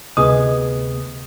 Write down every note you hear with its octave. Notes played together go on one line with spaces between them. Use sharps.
D2 C3 B3 G#4 D#5 D#6